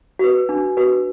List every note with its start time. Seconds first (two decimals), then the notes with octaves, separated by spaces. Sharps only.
0.19 F#4 B4
0.49 D4
0.77 F#4 B4